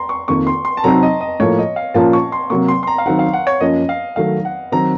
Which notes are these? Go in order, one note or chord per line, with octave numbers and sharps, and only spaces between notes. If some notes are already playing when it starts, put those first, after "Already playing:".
Already playing: A#5 C6
C#6
F2 D#3 A#3 C#6
C6
C6
A5
C3 F#3 C4 D#4 A#5
D#5
D#5
A2 F3 A#3 C#5
D#5
F5
A#2 F3 A#3 C#4 F4 A5
C#6
C6
C3 F#3 A#3 C#6
C6
C6
A#5
F5
D#3 F#3 C4 D#4 F#5
F5
F#5
C#5
F#2 F3 A#3 C#4 D#5
F5
D#3 F#3 A3 D#4 F5
F#5
D#3 F#3 C4 A#5